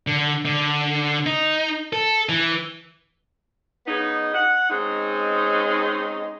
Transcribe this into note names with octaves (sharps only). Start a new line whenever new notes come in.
D3
D3
D#4
A4
E3
C#3 B3 D#4
F#5
G#3 C4 C#4 D#4